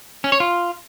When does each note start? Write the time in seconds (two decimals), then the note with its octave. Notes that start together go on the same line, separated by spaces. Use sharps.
0.24 C#4
0.32 C#5
0.40 F4